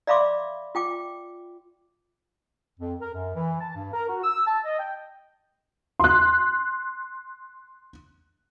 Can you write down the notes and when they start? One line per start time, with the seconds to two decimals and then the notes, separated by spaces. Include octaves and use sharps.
0.07 D5 E5 F5 B5 C6 D6
0.75 F4 G5 D6
2.79 F2
3.01 A#4
3.14 F#2
3.34 E3
3.60 A5
3.75 G2
3.93 A#4
4.09 F#4
4.24 E6
4.47 A5
4.65 D#5
4.78 G5
6.00 C6 F#6